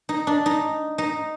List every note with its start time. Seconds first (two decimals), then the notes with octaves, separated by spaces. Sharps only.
0.09 D#4
0.27 D4
0.46 D#4
0.98 D#4